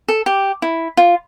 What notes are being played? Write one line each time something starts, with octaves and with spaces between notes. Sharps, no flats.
A4
G4
E4
F4